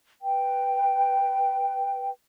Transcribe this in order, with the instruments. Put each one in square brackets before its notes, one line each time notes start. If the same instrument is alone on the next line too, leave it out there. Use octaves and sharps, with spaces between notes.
[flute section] B4 G5